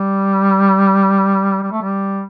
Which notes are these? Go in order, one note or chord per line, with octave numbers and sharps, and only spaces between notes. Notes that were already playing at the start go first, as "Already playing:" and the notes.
Already playing: G3
G3
A3
G3